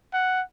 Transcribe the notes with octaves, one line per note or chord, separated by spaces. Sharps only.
F#5